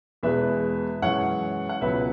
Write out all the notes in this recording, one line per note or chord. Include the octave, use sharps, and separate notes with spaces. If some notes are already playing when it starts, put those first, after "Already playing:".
E2 B2 G#3 B4 E5
F#2 E3 G#3 C#5 F#5
F#5
C#2 B2 F#3 B4 E5